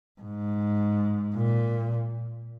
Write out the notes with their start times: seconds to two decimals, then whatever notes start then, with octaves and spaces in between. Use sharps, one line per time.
0.21 G#2
1.35 A#2